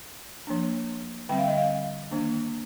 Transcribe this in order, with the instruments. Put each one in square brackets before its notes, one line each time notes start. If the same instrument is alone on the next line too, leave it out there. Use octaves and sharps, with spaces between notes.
[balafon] F3 A#3 D4
D3 G3 C4 G5
F5
D#5
F5
D#3 A#3 D4